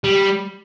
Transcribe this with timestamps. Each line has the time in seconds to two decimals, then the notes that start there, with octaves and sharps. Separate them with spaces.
0.04 G3